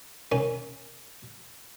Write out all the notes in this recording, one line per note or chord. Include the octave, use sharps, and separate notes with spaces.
D#3 C#4